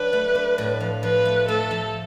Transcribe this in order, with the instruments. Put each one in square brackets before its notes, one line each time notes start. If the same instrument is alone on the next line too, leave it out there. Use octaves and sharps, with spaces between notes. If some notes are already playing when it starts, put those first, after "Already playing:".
Already playing: [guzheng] F#3 D4 [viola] B4
[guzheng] A3
D4
A2
F3
[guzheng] F3 [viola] B4
[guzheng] A3
[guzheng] A3 [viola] A4
[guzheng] F3